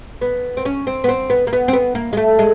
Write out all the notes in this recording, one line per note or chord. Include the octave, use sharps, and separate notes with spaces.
B3
C4
C#4
C4
B3
C4
B3
A#3
B3
C4
B3
A#3
G#3
A3
G#3